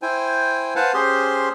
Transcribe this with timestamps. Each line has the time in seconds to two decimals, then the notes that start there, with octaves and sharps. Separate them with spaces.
0.02 E4 C5 G5 G#5
0.76 B4 C5 F5 F#5 G#5 A5
0.94 C#4 G4 G#4 C5 C6